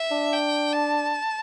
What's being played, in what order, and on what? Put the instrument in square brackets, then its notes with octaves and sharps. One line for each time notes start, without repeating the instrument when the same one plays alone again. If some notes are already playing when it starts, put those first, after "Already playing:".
Already playing: [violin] E5
[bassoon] D4
[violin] G5
A5